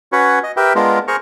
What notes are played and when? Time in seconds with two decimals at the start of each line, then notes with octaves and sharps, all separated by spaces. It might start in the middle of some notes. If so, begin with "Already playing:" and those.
0.12 C#4 F#4 B4 C#5
0.44 D#5
0.57 G4 A#4 B4 E5 G5
0.75 G#3 B3 D4 F4 A#4
1.08 G#4 A#4 C5 A#5 C#6